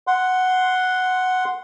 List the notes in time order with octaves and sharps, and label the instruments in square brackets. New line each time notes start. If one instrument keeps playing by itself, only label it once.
[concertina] F#5 C6